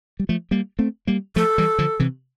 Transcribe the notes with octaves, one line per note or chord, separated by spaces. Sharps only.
G3
F3 A3
G3 A#3
A3 C4
G3 A#3
F3 A3 A4
E3 G3
D3 F3
C3 E3